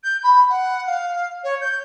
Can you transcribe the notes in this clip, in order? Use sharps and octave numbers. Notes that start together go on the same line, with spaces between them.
G6
B5
F#5
F5
C#5
G6